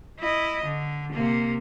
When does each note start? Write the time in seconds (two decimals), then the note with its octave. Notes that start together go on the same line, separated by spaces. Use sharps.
0.20 E4 D#5
0.65 D3
1.12 C3 A#3